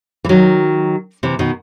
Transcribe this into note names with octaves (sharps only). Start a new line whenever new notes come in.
E3
D#3 F#3
C3 E3
B2 D#3